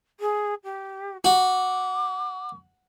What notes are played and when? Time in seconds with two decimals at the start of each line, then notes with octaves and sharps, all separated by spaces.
0.20 G#4
0.64 G4
1.24 F#4 D6